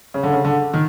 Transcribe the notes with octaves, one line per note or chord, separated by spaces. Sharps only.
C#3
D3
C#3
D3
D#3